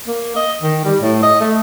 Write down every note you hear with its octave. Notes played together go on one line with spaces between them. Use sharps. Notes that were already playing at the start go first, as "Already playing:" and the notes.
A#3
D#5
D#3
G3
A2
D#5
A3